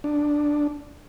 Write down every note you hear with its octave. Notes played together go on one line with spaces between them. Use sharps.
D4